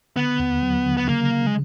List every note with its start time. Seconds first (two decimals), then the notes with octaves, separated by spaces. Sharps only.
0.16 D3 B3
0.39 D#2
0.62 F#3
0.85 D3
0.97 B3
1.08 C#3 A#3
1.31 C#3
1.47 G#3